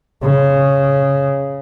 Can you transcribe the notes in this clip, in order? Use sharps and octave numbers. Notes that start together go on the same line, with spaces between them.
C#3